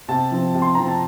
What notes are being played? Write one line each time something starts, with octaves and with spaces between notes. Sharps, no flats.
C3 A5
F3 C4
C3
C6
F3 C4 A#5
A5